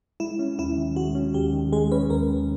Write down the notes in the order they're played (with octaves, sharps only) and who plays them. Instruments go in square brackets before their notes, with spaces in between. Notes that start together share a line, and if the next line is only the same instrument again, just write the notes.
[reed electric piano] G#3 [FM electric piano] E4
[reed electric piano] C#4
[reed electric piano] D#2 [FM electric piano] E4
[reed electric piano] D#3
[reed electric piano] G#3 [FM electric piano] F#4
[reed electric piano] C#4
[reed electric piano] D#2 [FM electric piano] G4
[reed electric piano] D#3
[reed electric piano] G#3 [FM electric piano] G#4
[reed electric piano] C#4 [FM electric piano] B4
[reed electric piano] D#2 [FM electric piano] A#4
[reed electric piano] D#3